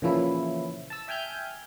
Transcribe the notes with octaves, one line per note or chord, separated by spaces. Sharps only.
A#2 C#3 E3 F3 C#4 E4
A5 E6
E5 G5 G#5 F6 G6